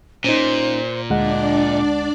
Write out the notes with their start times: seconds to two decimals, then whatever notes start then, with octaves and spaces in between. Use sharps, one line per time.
0.24 A#2 C#4 D#4 C5
1.10 D2 G#3 D4 D5 D#5 F#5